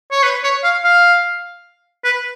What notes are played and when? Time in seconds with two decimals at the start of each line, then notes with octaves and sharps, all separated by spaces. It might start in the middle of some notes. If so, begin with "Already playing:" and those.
0.11 C#5
0.23 B4
0.43 C#5
0.64 F5
0.84 F5
2.05 B4